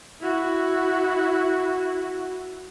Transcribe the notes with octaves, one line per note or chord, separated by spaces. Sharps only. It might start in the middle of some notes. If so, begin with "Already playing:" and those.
E4 F#4